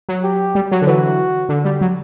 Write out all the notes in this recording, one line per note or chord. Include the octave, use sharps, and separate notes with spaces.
F#3
G4
G3
F#3
D3
E3 F#4
D3
G3
F#3